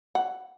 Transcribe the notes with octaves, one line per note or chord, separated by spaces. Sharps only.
F#5